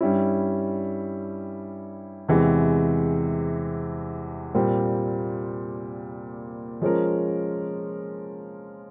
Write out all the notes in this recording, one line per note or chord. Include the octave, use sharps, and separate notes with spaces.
G2 G3 C#4 E4
E2 C3 E3 G#3
A#2 G3 C4 F4
F3 G#3 C#4 F4 A#4